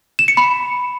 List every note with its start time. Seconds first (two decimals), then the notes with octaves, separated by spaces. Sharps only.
0.19 E7
0.28 C#7
0.37 B5